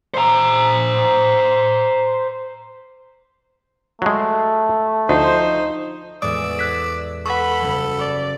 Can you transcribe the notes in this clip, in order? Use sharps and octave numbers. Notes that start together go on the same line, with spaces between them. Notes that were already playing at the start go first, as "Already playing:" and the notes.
C5 A#5
F#3 G#3 A3
D2 F3 D#4 C5
E2 A2 G#3 D5 D#6 E6
F#6 G#6 B6
A4 B4 F#5 B5 C#6
F#1 G3 C#5
D5